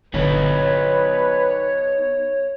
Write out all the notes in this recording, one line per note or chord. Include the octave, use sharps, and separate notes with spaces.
G1 D3 B3 D#4 B4 C#5